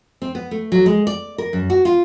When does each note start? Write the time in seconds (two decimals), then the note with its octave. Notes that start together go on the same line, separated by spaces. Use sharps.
0.22 C4
0.35 B3
0.51 A3
0.72 F#3
0.86 G#3
1.07 D5
1.38 A#4
1.53 F#2
1.70 F#4
1.85 F4